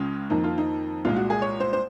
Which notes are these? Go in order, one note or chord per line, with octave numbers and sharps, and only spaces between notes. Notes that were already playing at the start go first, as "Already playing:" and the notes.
Already playing: C#2 C#3 G#3 C#4
F2 D#3 A#3 D#4
F4
D#4
C2 A#2 G#3 F4
F#4
G#4
C#5
C5
C5